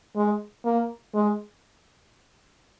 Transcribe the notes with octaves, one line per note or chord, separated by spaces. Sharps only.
G#3
A#3
G#3